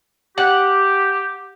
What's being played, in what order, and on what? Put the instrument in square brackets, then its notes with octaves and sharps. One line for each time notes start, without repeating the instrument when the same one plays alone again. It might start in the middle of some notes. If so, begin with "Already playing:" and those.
[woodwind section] G4 [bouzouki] F#5